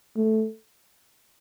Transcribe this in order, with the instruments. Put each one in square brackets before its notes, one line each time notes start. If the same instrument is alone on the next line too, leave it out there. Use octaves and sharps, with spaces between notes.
[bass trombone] A3